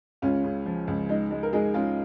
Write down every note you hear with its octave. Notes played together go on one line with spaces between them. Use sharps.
C#2 C#4 F4
C#3
F3
C#2
G#3 D#4
G#3
A#4
G#3 D#4 G#4
G#3 C#4 F4